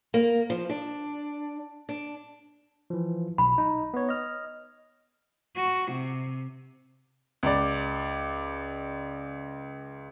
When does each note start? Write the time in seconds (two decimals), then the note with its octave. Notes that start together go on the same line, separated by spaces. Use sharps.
0.14 A#3
0.50 F3
0.69 D4
1.89 D4
2.90 E3 F3
3.38 B1 B5
3.58 D#4
3.94 B3 C#5
4.09 D#5 F6
5.56 F#4
5.92 C3
7.43 C#2 D5